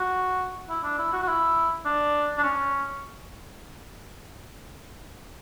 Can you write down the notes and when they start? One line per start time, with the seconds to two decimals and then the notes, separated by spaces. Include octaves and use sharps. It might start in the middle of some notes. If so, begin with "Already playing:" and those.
Already playing: F#4
0.70 E4
0.84 D4
0.99 E4
1.13 F#4
1.23 F#4
1.28 E4
1.86 D4
2.38 D4
2.44 C#4